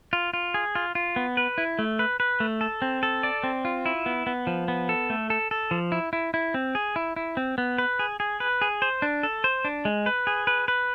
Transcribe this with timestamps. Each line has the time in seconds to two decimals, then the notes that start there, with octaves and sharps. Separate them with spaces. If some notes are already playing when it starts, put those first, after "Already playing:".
0.13 F4
0.34 F4
0.54 G#4
0.75 F4
0.95 F4
1.16 B3
1.37 B4
1.58 E4
1.79 A3
1.99 B4
2.20 B4
2.40 A3
2.61 A4
2.82 C4
3.03 A4
3.23 D5
3.44 C4
3.65 F4
3.86 E4
4.06 B3
4.27 B3
4.47 F3
4.68 B3
4.89 A4
5.10 A3
5.30 A4
5.51 A4
5.71 F3
5.92 E4
6.13 E4
6.34 E4
6.54 C4
6.75 G#4
6.96 E4
7.16 E4
7.37 C4
7.58 B3
7.78 B4
7.99 G#4
8.20 G#4
8.40 B4
8.62 G#4
8.82 C5
9.02 D4
9.23 A4
9.44 C5
9.65 D4
9.85 G#3
10.06 B4
10.27 G#4
10.47 B4
10.68 B4